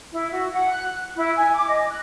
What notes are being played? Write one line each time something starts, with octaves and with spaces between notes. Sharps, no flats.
E4
F#4
F#5
F#6
E4
G#5
D6
D#5
F#6